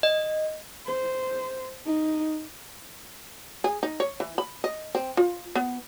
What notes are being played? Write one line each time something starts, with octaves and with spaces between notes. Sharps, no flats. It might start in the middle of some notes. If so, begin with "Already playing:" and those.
D#5
C5
D#4
G#4
D#4
C#5
E3
B5
D#5
C4
F4
B3